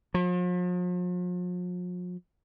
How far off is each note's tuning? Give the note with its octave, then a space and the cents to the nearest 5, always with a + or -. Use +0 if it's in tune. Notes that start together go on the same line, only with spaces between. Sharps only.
F3 +45